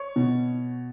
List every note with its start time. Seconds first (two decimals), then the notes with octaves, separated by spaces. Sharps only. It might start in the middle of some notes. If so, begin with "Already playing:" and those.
Already playing: C#5
0.16 B2